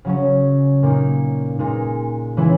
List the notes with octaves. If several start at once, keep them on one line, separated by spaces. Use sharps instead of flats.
C#3 F#3 C#4
A#2 A#3 D#4
A#2 G#3 D#4
C#3 E3 G#3 B3 E4